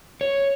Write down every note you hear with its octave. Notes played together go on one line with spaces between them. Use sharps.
C#5